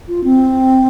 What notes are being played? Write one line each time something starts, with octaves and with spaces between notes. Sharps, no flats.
F4
C4